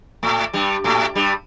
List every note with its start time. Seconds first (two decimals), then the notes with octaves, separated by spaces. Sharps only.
0.23 A2 A3
0.53 G2 G3
0.84 A2 A3
1.15 G2 G3